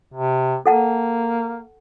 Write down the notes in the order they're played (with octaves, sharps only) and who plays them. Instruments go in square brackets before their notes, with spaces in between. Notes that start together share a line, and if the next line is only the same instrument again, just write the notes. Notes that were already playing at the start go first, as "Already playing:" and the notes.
[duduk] C3
[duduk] A#3 [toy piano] A4 F#5 A5